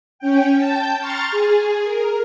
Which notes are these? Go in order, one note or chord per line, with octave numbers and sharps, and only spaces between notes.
C#4 G5
G5 A5 G6
A#5 C6 C#6 F6 A6
G#4
A#4